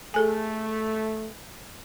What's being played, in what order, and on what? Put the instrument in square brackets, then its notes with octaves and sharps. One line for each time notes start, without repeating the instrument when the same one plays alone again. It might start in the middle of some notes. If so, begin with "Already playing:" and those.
[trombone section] A3 [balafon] G#4 A4 G#5